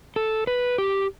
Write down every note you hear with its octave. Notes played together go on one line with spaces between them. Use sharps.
A4
B4
G4